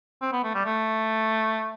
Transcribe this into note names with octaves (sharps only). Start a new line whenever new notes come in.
C4
B3
A3
G3
A3